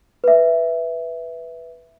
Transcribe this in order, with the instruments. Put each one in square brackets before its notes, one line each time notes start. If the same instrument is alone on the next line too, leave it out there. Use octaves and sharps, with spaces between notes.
[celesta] B4 E5